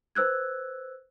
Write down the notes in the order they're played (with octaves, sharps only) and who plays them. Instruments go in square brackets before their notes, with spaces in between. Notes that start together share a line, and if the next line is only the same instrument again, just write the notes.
[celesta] B4 C5 E6 F#6 G#6